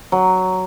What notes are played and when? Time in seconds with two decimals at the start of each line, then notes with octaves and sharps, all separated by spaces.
0.12 F#3